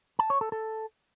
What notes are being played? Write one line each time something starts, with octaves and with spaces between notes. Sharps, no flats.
A5
C#5
A4
A4